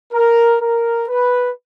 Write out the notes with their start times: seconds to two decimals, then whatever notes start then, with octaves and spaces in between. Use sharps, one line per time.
0.13 A#4
0.61 A#4
1.08 B4